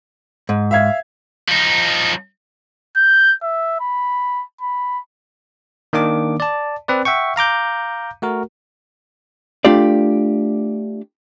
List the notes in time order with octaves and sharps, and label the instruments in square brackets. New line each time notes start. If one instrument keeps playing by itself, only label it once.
[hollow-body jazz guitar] G#2
[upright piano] E5 F5 G#6
[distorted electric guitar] F3 D#4
[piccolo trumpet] G6
E5
B5
B5
[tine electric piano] D#3 A#3 D4 D6
D5 A5
C4 B4 D5
E5 F#5 G5 C#6
F5 A#5 D6 G6
A3 F#4 A#4
[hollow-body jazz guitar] A3 D4 F4 G4 D5